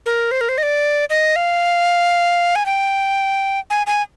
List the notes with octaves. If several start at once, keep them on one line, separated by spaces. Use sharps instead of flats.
A#4
C5
A#4
C5
D#5
D5
D#5
F5
G#5
G5
G#5
G#5